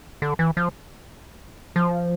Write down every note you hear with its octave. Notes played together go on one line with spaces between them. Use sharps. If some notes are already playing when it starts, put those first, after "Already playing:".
D3
E3
F3
F3